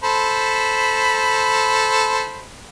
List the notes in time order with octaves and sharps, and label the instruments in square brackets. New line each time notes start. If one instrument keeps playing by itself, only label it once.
[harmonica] A4 C5 B5